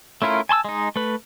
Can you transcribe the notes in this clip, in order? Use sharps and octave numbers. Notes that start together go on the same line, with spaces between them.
A3 C#4 E4 F4 A#4
G#5 A5 C6 E6
G#3 D#4
A3 B4